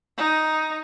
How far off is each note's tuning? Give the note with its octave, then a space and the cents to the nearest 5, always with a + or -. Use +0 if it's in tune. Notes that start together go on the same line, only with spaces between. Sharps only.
D#4 +5